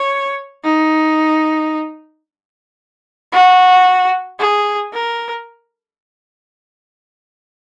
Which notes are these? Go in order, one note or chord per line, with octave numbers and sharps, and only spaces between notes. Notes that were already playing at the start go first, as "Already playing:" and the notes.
Already playing: C#5
D#4
F#4
G#4
A#4